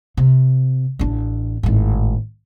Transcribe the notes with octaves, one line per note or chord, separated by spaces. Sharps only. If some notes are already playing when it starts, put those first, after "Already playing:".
C3
A1 D4
G#1 A2